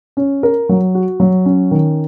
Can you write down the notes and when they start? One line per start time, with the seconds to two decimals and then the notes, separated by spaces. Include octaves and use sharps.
0.17 C#4
0.43 A#4
0.69 F#3
0.95 F#4
1.20 F#3
1.46 C#4
1.71 D#3